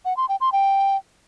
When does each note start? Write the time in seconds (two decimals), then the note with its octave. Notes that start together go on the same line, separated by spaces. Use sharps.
0.05 F#5
0.17 C6
0.29 G5
0.41 C6
0.52 G5